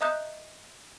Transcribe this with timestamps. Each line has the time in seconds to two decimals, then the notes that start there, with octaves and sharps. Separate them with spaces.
0.01 D#5 E5 A#5 D#6 F#6 G6